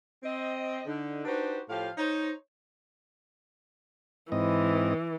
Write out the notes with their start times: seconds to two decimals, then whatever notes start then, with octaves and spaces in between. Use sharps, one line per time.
0.23 C4 D#5
0.86 D3 D#4
1.25 D4 D#4 F#4 G4 B4 C5
1.69 A2 F3 G4 F5
1.98 D#4 C5 C#5
4.32 G#2 E3 C4 D#5